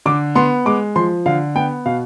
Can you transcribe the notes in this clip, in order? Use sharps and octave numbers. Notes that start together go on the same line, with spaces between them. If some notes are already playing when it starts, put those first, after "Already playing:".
D3 D6
B3 C6
G#3 D6
F3 C6
D3 F5
B3 G5
B2 F5